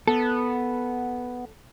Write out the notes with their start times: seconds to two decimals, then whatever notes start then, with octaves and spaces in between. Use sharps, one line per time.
0.08 B3 A4